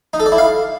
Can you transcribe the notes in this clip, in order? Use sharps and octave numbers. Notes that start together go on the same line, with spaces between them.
D#4
A4
D5
E4
F5